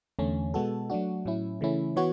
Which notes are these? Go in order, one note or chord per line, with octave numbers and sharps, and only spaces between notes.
E2 D3 A3 C#4
B2 G#3 B3 F#4 A4
F#3 A3 D4 F#4
A2 F#3 C#4 E4
C#3 E3 A3 C#4 E4
E3 B3 F#4 C#5